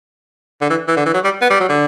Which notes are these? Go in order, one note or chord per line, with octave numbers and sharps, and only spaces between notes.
D3
E3
E3
D3
E3
F#3
G3
B3
G3
F#3
D3